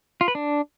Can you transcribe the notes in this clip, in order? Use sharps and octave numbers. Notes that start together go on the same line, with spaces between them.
F4
B4
D4